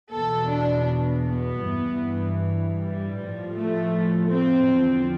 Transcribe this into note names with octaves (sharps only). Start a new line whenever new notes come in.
E2 B2 A4
D4
B3
G2 E3
G3
A2 F3
A3
C4
E2 D3 F3